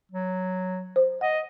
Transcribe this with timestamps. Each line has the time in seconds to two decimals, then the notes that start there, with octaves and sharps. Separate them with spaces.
0.12 F#3
0.96 C5
1.21 D#5 F#5